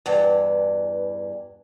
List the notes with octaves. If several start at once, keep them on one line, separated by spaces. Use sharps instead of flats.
E2 G2 E3